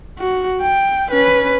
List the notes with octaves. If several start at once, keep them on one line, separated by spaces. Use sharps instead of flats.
F#4
G5
C#4 B4